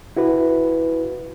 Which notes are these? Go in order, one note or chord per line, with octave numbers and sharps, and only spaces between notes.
E4 F#4 B4